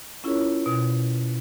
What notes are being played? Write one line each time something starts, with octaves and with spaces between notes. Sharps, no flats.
C#4 E4 F4 G#4 A#4 C#5
B2